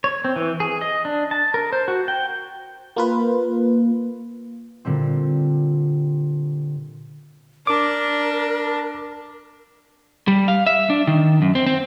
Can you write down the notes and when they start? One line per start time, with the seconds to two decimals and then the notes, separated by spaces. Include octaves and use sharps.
0.04 C#5
0.25 C4
0.36 E3
0.60 G#4
0.81 D#5
1.05 D4
1.31 A5
1.54 A#4
1.73 C5
1.88 F#4
2.08 G5
2.96 A#3 F4 B4
4.85 A#2 D3 G3 C4
7.67 D4 A#4 D6
10.28 G3
10.48 F5
10.67 E5
10.90 D4
11.07 D#3
11.42 F#2
11.55 C4
11.66 C4